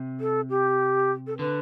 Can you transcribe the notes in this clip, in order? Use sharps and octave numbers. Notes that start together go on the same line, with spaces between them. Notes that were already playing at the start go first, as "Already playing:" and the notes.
Already playing: C3
A4
G4
A4
D3 B4